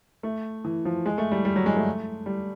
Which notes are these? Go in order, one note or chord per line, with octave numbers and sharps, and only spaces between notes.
A3
E3
F3
G#3
A3
G3
G3
F#3
G#3
A3
G3